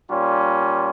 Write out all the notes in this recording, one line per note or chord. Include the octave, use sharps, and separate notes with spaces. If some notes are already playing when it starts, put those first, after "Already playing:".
A#2 G3 C#4 F4